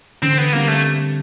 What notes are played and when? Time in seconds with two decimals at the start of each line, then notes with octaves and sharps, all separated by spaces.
0.22 D3 C4
0.38 B3
0.52 G3 A#3 C4
0.68 A3